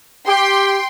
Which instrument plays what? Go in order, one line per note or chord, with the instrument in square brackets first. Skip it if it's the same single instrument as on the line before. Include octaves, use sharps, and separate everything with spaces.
[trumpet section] G4 [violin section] G5 C6